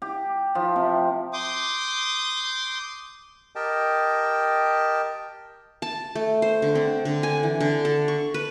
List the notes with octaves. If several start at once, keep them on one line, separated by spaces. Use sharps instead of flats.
G4
F3
C3
C6 D6 D#6 G6
G4 A#4 D#5 G5 A5
A5
A3
C5
D3
C4
D3
G#5
E3
D3
A4
C#6
B4